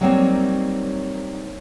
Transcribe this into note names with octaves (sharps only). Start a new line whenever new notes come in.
F#3 G3 A#3 C4 D#4 C#5